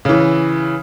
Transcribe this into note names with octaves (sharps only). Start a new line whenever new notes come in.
C#3 E3